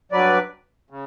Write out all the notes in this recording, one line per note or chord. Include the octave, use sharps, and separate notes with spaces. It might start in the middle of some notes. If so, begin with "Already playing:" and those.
G2 F#3 B4 D5
C#3